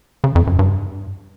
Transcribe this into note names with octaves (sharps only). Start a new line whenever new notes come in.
C#3
F2
F#2
G2